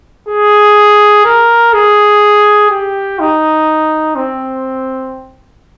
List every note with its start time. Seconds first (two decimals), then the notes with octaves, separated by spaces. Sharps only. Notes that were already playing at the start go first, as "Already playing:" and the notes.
0.29 G#4
1.25 A#4
1.73 G#4
2.70 G4
3.19 D#4
4.15 C4